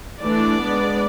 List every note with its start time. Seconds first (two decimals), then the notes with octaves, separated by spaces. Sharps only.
0.21 E3 A3 D4 D5
0.61 G#3 B3 D4